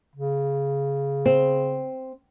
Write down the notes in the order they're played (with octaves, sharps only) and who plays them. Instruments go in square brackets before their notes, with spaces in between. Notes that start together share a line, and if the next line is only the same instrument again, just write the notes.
[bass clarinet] C#3
[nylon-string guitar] C4